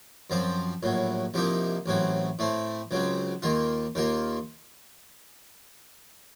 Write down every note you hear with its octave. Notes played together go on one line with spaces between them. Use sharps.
F#2 F3 C4
A#1 A2 F#3
C2 C3 F3 A#3 D#4
A1 A2 F#3 C4
A2 A3 C4
C#2 C#3 F#3 C4
D#2 D#3 A#3 F4
D#2 D#3 A#3 F4